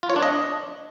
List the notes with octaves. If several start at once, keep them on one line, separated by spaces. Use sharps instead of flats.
F4
C#5
D4
D#5